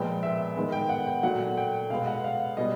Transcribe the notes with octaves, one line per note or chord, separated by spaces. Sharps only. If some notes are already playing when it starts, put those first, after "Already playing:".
Already playing: A#2 F3 G#3 B3 G5
E5
D#3 G#3 B3
G5
F#5
G5
A#2 F#3 A3 F#5
G5
B2 G#3 B3 F5
F#5
F5
B2 G3 B3 D#5